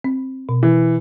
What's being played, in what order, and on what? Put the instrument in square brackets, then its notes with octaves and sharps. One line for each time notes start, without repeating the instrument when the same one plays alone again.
[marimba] C4
B2
[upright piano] E3